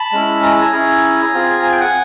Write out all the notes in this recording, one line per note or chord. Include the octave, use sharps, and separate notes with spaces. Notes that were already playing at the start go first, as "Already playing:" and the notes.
Already playing: A5 B5
G#3 C#4 E4
A#5
A5
G#5 A#5
C#4 E4 G#4
C4 F4 G#4
G#5
G5
F#5 G#5